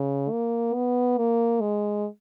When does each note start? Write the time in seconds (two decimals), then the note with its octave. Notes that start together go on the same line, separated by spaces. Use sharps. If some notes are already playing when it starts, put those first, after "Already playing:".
Already playing: C#3
0.31 A#3
0.74 B3
1.18 A#3
1.61 G#3